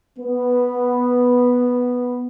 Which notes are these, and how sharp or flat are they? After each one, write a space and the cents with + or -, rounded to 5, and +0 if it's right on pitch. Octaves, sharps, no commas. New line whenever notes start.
B3 -5